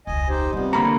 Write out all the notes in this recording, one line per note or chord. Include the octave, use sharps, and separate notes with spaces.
E1 C#2 D#5 G#5
D#4 G4 C5
C3 E3 G3 B3 F4
D3 A#3 F#4 A#5 B5